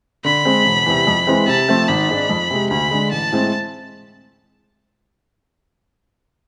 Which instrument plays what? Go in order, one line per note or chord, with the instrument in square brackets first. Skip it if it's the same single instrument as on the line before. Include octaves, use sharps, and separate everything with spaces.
[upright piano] D3 [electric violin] B5
[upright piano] G#3 C4
E1
E2 C3
F2
E3 G#3 C4
[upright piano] C3 [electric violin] A5
[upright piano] F3 A3 C4
[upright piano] G#1 [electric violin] B5
[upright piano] G#2 G#3 D4
F2
C3 G#3
[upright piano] D2 [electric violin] B5
[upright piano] D3 G#3
[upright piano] A1 [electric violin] A5
[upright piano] A2 G#3 C4